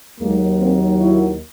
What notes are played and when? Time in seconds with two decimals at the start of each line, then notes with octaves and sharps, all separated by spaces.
0.20 D#2 D#3 F#3 G#3 A#3
0.59 A#3 C4
0.99 E4 F#4